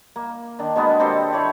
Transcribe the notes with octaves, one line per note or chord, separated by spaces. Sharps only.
A#3
D#3 D4
B2 G#3 A#3 B3
C4 G4 A4 C5
E4 C#5 D5